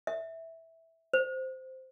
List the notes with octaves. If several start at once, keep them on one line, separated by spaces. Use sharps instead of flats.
E5
C5